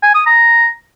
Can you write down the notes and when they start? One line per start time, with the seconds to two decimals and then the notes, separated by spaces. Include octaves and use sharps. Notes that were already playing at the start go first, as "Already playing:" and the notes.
0.03 G#5
0.14 D#6
0.26 A#5